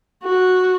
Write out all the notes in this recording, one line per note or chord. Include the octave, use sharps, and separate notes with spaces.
F#4